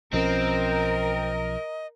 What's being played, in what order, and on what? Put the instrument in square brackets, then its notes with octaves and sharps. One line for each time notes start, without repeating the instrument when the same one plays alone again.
[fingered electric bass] B1 F3 C#4 [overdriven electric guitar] C4 [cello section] A#4 [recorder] D#5